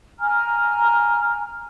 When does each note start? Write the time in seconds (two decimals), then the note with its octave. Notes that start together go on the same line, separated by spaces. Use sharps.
0.20 G#5 A#5 F6